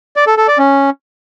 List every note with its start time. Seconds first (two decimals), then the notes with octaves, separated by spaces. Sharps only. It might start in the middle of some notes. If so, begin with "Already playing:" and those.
0.16 D5
0.27 A4
0.37 A4
0.48 D5
0.58 C#4